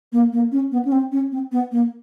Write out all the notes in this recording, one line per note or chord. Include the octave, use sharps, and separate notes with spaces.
A#3
A#3
C#4
B3
C#4
C4
C#4
C4
B3
A#3